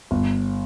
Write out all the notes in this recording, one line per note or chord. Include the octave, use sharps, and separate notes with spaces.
G1